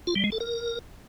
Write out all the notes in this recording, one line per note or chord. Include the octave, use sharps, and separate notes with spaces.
F4
G3
G#3
A4
A#4